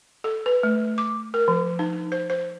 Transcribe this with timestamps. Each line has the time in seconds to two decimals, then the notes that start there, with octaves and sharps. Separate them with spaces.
0.24 A4
0.46 B4
0.63 A3
0.98 D6
1.34 A#4
1.48 F3
1.79 D#4
2.12 C5
2.30 C5